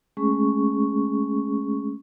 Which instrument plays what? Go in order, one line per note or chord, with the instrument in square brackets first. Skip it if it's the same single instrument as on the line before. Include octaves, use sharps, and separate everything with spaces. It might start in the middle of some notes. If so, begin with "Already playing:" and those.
[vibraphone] G#3 A3 C#4 G#4 C#6